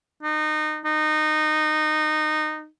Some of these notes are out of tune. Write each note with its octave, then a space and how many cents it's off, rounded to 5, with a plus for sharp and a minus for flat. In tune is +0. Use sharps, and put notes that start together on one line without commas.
D#4 -25
D#4 -20